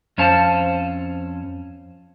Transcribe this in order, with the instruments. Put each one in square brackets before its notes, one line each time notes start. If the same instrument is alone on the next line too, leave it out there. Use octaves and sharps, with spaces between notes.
[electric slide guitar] F2 C#4 C5 C#5 F5 A5